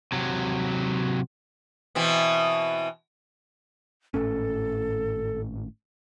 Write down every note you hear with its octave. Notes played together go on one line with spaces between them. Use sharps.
C3 F#3
B2 E3 C4
G#1 A2 C#4 A4